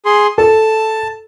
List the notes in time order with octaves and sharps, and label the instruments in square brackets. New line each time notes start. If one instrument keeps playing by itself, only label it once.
[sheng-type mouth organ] G#4 C6
[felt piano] A4 [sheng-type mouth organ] A5